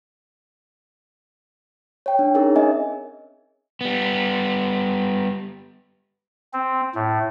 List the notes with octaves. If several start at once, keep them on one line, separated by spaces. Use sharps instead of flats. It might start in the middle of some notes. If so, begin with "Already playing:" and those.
C#5 G5
D4
C#4 D#4 G#4 A#4 C#5
C4 D#5 E5 G#5
G3 B3
C4
A2